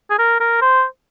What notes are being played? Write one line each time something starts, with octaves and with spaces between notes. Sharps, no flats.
G#4
A#4
A#4
C5